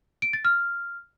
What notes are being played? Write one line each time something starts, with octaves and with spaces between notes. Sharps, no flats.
D7
A6
F6